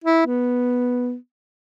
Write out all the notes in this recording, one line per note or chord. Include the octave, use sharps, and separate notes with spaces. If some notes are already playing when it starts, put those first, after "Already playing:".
E4
B3